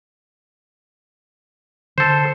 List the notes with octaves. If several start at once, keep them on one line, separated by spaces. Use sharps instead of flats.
D3 B3 D4 A4 C5